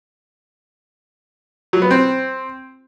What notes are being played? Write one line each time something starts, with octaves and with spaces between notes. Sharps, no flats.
F#3
B3
C4